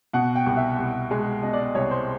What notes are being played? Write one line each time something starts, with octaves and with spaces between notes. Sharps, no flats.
B2 F#5
G5
C2
E5
C2
G#3
B2 D#5
D5
D#5
C2 C#5
C5